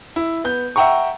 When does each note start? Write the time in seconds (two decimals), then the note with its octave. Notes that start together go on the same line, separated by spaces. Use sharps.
0.16 E4
0.44 B3 G6
0.76 E5 F#5 G5 A#5 C#6